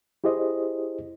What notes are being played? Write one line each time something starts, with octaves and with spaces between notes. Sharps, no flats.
E4 G4 G#4 C5 D#5